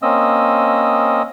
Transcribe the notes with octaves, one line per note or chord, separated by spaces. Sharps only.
A#3 C4 C#4 D#5 D#6 E6